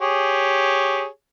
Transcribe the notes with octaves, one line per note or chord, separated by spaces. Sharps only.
G4 G#4 C#5